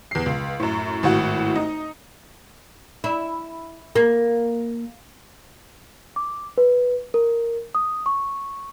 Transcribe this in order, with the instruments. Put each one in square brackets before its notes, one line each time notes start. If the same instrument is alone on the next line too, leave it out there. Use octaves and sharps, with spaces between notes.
[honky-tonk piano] E2 C7
C#2
F#2 A2
G#1 A2 F#4
D#4
[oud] E4
A#3
[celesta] D6
B4
A#4
D#6
C#6